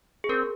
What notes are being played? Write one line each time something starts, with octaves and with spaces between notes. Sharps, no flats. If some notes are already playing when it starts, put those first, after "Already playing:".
G#4
C4 A#4